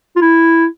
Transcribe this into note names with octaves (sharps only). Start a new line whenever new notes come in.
F4
E4